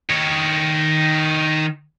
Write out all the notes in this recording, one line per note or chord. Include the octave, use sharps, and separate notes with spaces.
D#3 C#5